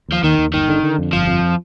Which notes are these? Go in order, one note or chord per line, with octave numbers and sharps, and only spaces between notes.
D#2 F3
D#2 D#3
D#2
G1 D#3
D3
D3
F2
G1 F3
F2